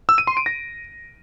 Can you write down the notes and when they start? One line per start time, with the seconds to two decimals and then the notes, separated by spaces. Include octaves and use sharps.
0.09 E6
0.18 D#7
0.27 C6
0.37 D7
0.46 A#6